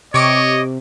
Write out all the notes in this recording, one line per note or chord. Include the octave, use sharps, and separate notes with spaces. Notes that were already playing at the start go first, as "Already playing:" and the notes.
C3 C#5 D#5 C#6 D6